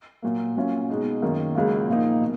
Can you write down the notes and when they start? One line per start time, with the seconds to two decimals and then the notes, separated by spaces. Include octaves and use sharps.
0.22 A#2 F#3 A#3
0.56 A#2 F#3 C#4 F4
0.89 B2 G#3 D#4
1.22 F#2 D#3 A#3
1.55 C#2 C#3 F#3 A#3 F4
1.88 A#2 F3 A#3 D#4
2.21 B2